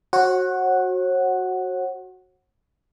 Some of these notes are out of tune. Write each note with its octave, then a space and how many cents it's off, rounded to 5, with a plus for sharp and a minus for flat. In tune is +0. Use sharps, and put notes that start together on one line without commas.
F#4 +0 C#5 -45 F#5 +0